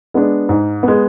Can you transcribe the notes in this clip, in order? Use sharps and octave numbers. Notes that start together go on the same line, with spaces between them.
G#3 B3 D4
G#2
G#3 B3